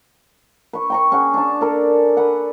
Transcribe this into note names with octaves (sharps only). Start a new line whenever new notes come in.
B4 C#6
G5 A#5 C#6
C#4 G#4 F#5
D4 A5
A4 A#4 D5
B4 F#5